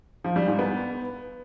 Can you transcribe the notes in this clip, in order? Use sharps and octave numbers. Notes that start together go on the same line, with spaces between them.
F3
G3
G#2
B3